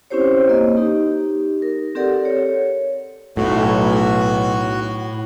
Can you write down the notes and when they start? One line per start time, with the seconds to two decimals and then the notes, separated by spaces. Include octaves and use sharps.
0.10 C4 C#4 E4 G4 C5 C#5
0.49 A#3 D#5
0.77 D#4 G4
1.62 A#4
1.95 C4 G4 A4 A#4 D5 F#5
2.23 A4 C#5
3.37 B1 A2 F#4